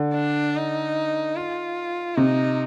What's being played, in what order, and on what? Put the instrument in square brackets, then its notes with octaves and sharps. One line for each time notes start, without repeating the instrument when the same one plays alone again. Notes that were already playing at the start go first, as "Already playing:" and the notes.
Already playing: [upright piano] D3
[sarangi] D4
D#4
F4
[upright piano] C3 [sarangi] D#4